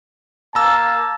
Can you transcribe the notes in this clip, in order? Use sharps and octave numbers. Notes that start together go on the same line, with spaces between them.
A#3 A5 A#5 E6